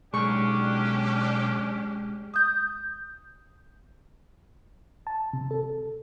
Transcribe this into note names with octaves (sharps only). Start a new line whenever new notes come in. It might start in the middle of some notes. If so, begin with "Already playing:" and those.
B1 G#3 C#4 D4 G4 C#6
D#6 G6
A5
C3
A4